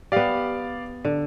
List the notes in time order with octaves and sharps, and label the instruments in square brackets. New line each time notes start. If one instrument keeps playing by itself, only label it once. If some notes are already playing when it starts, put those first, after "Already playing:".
[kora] B3 G4 [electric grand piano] D5 F5
[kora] D3